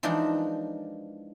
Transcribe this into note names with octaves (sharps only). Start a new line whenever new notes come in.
E3 F3 G#3 D4 D#4 A#4